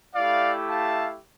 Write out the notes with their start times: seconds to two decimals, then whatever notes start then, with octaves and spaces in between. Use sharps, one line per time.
0.15 A3 E4 G4 D5 F5
0.69 F5 A5